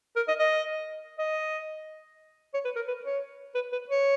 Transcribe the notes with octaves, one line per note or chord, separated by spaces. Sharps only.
A#4
D#5
D#5
D#5
C#5
B4
A#4
B4
C#5
B4
B4
C#5